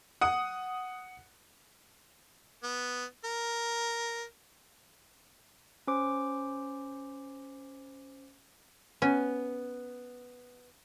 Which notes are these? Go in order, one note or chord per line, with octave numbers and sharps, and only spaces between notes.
F#5 D#6
B3
A#4
C#4 C5 D6
B3 C#4